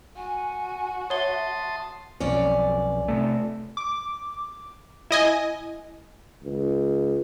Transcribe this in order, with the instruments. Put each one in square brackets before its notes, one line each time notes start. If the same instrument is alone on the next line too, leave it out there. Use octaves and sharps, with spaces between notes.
[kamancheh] F#4 [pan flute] G#5
[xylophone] C#5 G7 [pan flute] E5 [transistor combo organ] A5 C6 D#6
[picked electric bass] B1 F2 [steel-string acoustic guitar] C#4 D5
[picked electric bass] C3 A3
[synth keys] D6
[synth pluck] E4 D#5 G#5
[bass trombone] C#2